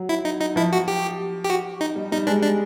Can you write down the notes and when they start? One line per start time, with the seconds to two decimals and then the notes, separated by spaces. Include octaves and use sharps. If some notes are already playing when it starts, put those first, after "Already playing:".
Already playing: F#3
0.09 E4
0.25 D#4
0.40 D#4
0.56 F3 E4
0.73 F#4
0.88 G4
1.44 G4
1.50 F#4
1.81 D#4
1.96 G3
2.12 G3 D#4
2.27 G#3 D4
2.43 D4